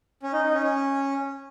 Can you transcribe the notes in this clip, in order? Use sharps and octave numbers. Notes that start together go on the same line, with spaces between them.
C#4
D#4
D#4
C#4
C#4